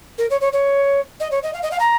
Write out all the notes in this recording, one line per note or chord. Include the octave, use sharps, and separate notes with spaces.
A#4
C#5
C#5
C#5
D#5
C#5
D#5
F5
D#5
F5
A#5